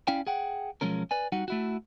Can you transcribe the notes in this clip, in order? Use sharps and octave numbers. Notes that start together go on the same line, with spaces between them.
C#4 E4 D5 F5 G5
G#4 F#5 G5
B1 F3 G#3 C#4 A#4
B4 D5 G#5
G3 D#4 F#4 F#5
A3 E4 F#4